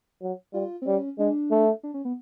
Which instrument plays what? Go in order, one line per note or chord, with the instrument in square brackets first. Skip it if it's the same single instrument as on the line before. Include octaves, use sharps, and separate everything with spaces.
[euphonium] F#3
[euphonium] G3 [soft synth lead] F4
[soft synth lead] C4
[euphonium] G3 [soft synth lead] C#4
[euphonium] G#3 [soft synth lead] D4
[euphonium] A3
[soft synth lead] D4
C#4
B3